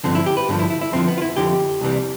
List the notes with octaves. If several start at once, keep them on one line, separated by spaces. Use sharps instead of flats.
G2 D3 F3 C4
E4
G4
B4
G2 D3 F3
E4
E4
E4
F2 D3 F3 C4
B3
F4
E4
F2 D3 F3 G4
C2 C3 E3 G3